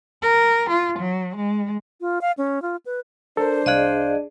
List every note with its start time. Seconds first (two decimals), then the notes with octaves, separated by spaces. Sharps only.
0.22 A#4
0.70 F4
0.99 F#3
1.36 G#3
2.01 F4
2.21 F5
2.38 C#4
2.62 F4
2.86 B4
3.37 D4 A4 A#4 C5
3.66 C2 G#4 D5 D#5 F5 F#6